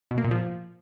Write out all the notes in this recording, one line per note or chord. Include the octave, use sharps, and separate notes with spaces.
B2
A#3
A#2
F3